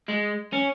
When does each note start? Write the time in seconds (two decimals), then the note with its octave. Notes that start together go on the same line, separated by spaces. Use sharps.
0.08 G#3
0.53 C#4